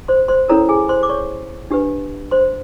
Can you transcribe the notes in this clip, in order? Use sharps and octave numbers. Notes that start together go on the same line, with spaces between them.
C5 C6
C5 C6
C#4 E4 A4 A#4 C#5 A#5
G#4 G#5
C5 C6
D6
C#5 C#6
D4 G4 B4
C5 C6